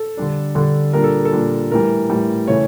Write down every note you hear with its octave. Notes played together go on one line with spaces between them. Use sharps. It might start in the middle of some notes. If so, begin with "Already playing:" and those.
Already playing: A4
D3 G3 D4
D3 G3 D4
A#2 G3 D4 A#4
A4
A4
A#2 G3 D4
A2 E3 G3 A#4
A2 E3 G3
C#3 E3 A3 C#5